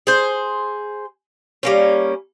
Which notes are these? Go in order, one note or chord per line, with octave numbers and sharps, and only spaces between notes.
G#4 C5
G3 A#3 C#4